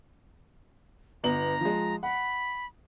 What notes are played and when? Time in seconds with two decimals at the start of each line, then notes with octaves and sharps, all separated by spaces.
1.24 G1 B3 A#5 F#7
1.61 F3 G#3
2.03 F#5 B5